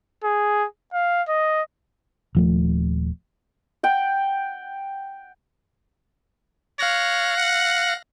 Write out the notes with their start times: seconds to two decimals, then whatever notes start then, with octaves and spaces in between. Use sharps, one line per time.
0.24 G#4
0.93 F5
1.29 D#5
2.35 D#1 F3 A3
3.83 F#5 G5
6.79 C#5 F5 F#6 A#6
7.38 F#5